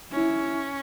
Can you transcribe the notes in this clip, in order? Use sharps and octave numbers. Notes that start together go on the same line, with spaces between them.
C#4 E4